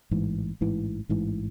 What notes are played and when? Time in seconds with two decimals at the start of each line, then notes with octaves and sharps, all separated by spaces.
0.11 A1 G#2 E3
0.61 A1 G#2 E3
1.09 A1 G#2 E3